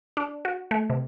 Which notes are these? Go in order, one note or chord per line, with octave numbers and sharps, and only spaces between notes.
D4
F#4
A3
C3